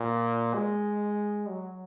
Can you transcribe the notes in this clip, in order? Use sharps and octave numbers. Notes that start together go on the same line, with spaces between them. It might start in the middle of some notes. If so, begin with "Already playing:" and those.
Already playing: A#2
G#3
F#3